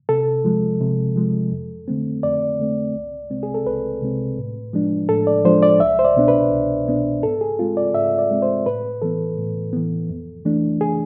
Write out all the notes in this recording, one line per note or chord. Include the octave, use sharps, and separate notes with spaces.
C3 A4
F3 G#3
C3
F3 G#3
F2
D3 A3 C4
F2 D5
D3 A3 C4
C2
C3 G#3 C4
G#4
A4
C2 B4
C3 G#3 C4
A2
F3 G#3 D4
A2 A4
D5
F3 G#3 D4 C5
D5
C2 E5
C5
D5
B2 B3 D4
B4
C2
B2 B3 D4
G#2 A4
G#4
G#3 C4 F4
D5
G#2 E5
D5
G#3 C4
C5
A2 B4
E3 B3 A4
A2
E3 B3
F2
E3 A3 D4
G#4